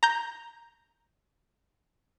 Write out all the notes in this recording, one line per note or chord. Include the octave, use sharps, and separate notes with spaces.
A#5 G6